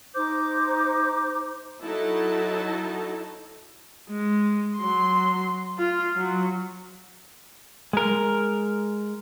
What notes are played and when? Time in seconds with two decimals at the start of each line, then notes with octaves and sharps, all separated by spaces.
0.15 D#4 C5 D6 G6
1.84 F#3 D#4 E4 A4 A5
4.09 G#3
4.77 F#3 C6
5.78 F4
6.17 F#3
7.93 G#3 A#4